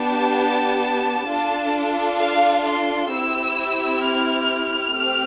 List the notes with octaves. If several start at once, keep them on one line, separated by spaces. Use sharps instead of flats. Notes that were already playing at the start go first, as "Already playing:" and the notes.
Already playing: B3 D4 G4 A5
D4 F4 A4
F5
C6
C4 E4 G4 E6
F6
A3 C4 G4